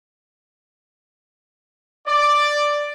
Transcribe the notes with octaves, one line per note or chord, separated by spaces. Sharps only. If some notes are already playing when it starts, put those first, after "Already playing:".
D5